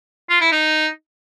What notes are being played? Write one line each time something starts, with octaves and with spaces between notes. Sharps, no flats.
F4
E4
D#4